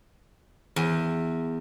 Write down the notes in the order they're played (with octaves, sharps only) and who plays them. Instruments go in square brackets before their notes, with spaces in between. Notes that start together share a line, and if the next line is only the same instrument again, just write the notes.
[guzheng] E2